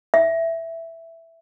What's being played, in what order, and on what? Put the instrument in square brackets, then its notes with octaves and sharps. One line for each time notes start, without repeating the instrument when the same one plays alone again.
[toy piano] E5